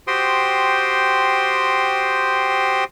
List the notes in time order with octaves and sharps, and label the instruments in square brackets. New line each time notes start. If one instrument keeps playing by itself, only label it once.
[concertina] F#4 G4 C5 G5 C6 D#6